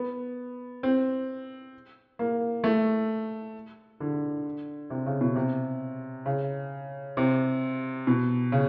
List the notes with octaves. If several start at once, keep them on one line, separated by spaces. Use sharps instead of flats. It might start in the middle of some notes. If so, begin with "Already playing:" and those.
Already playing: B3
C4
A#3
A3
D3
C3
C#3
B2
C3
C#3
C3
B2
C#3